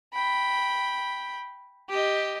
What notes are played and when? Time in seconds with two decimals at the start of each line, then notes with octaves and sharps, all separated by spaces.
0.14 G5 B5
1.89 G4 D#5